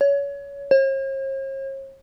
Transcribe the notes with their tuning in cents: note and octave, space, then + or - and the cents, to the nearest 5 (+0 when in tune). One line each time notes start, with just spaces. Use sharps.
C#5 +25
C#5 -45